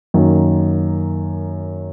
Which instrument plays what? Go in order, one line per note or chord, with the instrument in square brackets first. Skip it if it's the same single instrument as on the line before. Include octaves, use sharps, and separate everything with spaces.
[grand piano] F#2 D#3 A#3